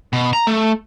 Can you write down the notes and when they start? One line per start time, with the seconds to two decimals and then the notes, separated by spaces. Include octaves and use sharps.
0.13 B2
0.33 A#5
0.47 A3